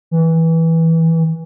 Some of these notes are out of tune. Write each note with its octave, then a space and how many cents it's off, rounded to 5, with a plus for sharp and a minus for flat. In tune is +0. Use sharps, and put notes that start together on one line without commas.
E3 -15